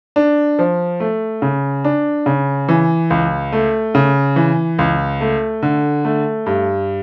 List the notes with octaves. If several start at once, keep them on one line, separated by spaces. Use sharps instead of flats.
D4
F3
A3
C#3
D4
C#3
E3
C#2
A3
C#3
E3
C#2
A3
D3
A3
G2